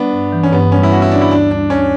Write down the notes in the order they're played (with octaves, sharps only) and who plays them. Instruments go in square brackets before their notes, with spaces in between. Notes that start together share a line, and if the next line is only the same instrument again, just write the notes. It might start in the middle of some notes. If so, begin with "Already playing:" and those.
Already playing: [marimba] G3 [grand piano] B3 D4
[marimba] G2
E3
[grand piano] C#4
[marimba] G2 [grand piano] B3
[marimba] G3 [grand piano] C#4
[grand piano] E4
[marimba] B3 [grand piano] F#4
[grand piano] E4
[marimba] D3 [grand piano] D4
[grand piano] E4
[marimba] D2 [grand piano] D4
[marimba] G3 [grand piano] D4
[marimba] D2 [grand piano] C#4